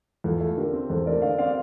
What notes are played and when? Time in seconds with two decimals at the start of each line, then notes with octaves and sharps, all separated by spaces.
0.24 E2 F4 A4
0.41 A3
0.57 D3 G4 A#4
0.73 C4
0.90 E2 A4 C5
1.06 A3 A#4 D5
1.22 D3 D5 F5
1.38 C4 D5 F5